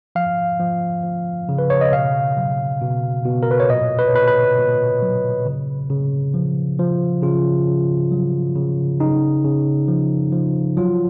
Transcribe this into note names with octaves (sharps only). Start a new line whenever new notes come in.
F3 F5
F3
F3
C#3
B4
C#5
D#5
B2 F5
F#3
B2
B2
A#4
B4
C#5
A#2 D#5
B4
C#5
A#2 B4
B4
A#2
F#3
C#3
C#3
F3
F3
C#3 F4
C#3
F#3
C#3
C#3 D#4
C#3
F3
F3
F#3 F4